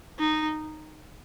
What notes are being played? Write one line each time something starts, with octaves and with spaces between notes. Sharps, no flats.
D#4